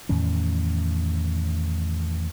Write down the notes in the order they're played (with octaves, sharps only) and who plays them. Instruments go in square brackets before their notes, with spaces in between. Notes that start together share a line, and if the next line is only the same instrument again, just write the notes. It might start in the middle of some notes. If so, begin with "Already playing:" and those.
[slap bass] E2 A2 D#3 C#4